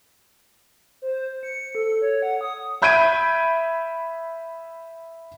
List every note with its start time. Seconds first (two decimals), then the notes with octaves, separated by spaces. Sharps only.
1.02 C5
1.43 C#7
1.75 A4
2.02 C#5
2.22 F#5
2.41 D#6
2.82 E5 B5 G6 G#6 D7 D#7